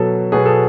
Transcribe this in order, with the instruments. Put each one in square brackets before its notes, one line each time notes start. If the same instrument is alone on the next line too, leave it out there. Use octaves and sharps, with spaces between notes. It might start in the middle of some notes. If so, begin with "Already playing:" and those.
Already playing: [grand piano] B2 F#3 B3 A4
B2 F#3 B3 G#4
A4